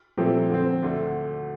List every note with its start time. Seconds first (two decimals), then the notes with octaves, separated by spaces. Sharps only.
0.17 A#2 F3 A3 C4 G4
0.49 D3 F3 C4
0.82 D2 D3 A3 D4